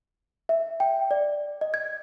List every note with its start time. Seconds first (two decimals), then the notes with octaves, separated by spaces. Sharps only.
0.49 E5
0.80 G5
1.11 D5
1.61 D#5
1.74 G#6